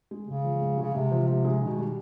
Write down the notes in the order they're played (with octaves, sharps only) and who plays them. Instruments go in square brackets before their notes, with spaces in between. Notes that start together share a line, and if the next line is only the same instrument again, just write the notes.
[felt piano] G#3
[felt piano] G#2 [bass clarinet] C#3
[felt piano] F3
G#2
G#3
[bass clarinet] C#3
[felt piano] G#2 [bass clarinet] C3
[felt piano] F3
[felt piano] G#2 [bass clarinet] C3
[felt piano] G#3
[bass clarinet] B2 [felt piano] D#3
[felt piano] G3